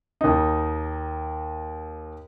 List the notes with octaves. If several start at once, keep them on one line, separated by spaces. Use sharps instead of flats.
D#2 D#4